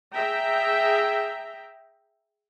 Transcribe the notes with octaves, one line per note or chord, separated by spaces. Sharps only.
G#4 E5 G5 A#5